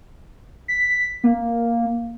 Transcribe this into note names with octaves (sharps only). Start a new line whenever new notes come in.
B6
A#3